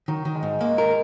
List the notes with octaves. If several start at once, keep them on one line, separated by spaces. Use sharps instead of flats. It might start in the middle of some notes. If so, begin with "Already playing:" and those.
D#3 F#3
D#3
G#3
G#2
G#3 A#3
A#4